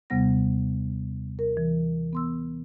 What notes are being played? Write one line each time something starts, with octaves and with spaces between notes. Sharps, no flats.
D#2 C3 G3 B3 F#5 A#6
A#4
E3
B3 C6 E6